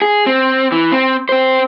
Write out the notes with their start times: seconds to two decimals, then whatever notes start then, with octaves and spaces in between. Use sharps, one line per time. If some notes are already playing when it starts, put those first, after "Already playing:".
0.02 G#4
0.26 C4
0.72 E3
0.92 C4
1.29 C4 C5